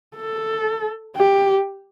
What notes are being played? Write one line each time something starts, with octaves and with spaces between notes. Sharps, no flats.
A4
G4